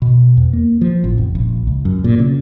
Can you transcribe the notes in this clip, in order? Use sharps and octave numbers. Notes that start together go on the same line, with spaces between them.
B2
E2
A#3
F3
A1
F1
A#1
C#2
F#2
A#2
C#3